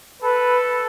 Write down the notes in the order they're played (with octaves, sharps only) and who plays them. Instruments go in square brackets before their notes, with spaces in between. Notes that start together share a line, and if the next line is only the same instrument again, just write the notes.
[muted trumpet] A4 [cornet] B4